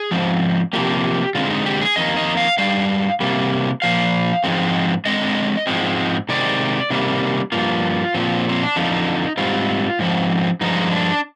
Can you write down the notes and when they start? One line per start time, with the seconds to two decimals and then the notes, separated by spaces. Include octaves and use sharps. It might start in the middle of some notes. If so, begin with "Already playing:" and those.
Already playing: G#4
0.11 G#2 F3 C4
0.73 C3 F3 A#3 G4
1.35 D3 G#3 C4 F4
1.50 D#4
1.66 G4
1.81 G#4
1.96 F2 D#3 A#3 D#5
2.17 D#5
2.37 F5
2.58 G2 D3 G3 F5
3.20 C3 G3 A#3
3.82 A#2 F3 F5
4.44 G#2 F3 G#3 C4
5.05 D3 G#3 C4 D#5
5.67 G#2 F3 G#3 C4
6.29 C3 D#3 G#3 C4 D5
6.90 C3 D#3 G3 A#3
7.52 G2 F3 A#3 F4
8.14 A#2 F3 C4
8.49 C4
8.62 D4
8.76 F2 D3 F3 D#4
9.37 G#2 G3 C4 F4
9.99 G#2 F3 C4
10.61 G2 F3 G#3 D#4
10.91 D4